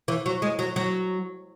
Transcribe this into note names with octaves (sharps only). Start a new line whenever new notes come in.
E3
F#3
G#3
F#3
F#3